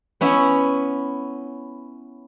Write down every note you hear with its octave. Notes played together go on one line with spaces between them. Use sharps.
B3 C#4 E4 E5